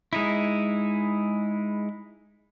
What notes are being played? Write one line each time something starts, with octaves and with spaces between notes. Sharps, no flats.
G#3 D#4 E4